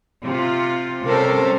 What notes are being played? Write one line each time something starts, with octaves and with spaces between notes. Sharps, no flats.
C3 F4
C3 G3 C#4 A4 A#4 C5